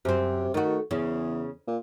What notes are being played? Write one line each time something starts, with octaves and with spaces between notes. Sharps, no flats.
F#2 C3 C4
D#3 A3 F#4
E2 C#3
A#2